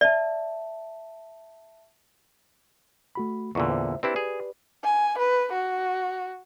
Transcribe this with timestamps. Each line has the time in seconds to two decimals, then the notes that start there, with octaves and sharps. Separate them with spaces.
0.01 D5 E5 A5
3.15 A3 F#4 B5
3.55 E2 A#2 D3 D5 C#6
3.69 C5 E5
4.03 C4 D4 E4 G4 B4 D5
4.16 G#4
4.84 G#5
5.18 B4
5.53 F#4